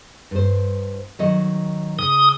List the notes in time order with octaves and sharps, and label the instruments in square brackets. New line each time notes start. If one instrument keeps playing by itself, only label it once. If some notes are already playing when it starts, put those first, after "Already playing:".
[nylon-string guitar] G2 C5
D#3 F#3 D#5
[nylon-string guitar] C#3 [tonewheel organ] D#6